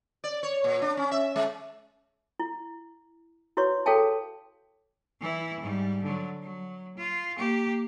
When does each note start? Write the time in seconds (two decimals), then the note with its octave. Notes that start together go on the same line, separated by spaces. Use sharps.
0.24 D5
0.43 C#5
0.64 A#2
0.82 D4
0.97 C#4
1.11 E5
1.36 G#3
2.39 E4
3.57 E4 F#4 B4 C#5 C#6
3.86 G#4 A4 C#5 F5 G5 A5
5.20 E3 E4
5.60 G#2 G3
6.03 D3 F#3
6.43 F#3
6.97 F4
7.36 A#3 G4